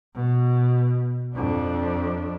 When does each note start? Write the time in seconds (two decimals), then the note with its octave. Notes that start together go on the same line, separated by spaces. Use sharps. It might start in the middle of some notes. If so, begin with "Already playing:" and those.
0.15 B2
1.35 F2 D4